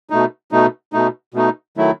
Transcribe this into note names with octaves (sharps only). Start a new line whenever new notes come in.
B2 A3 D#4
B2 A3 D#4
B2 A3 D#4
B2 A3 D#4
D#3 F#3 A3 E4